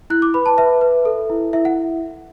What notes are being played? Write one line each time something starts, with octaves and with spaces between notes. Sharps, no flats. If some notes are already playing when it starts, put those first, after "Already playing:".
E4 F#6
D6
B4 B5
A5
B4 E5
B4
A4
E4
E4 E5
F#5